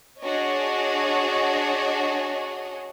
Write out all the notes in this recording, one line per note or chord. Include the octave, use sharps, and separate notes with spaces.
D4 F#4 G#4 C#5 D#5